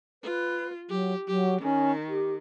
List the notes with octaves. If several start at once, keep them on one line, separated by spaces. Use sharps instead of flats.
F4 B4
F#3 G4
F#3 G4
D#3 C#4
G4